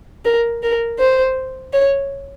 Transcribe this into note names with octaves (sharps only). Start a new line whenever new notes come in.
A#4
A#4
C5
C#5